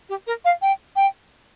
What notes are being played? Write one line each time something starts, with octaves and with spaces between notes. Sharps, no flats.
G4
A#4
F5
G5
G5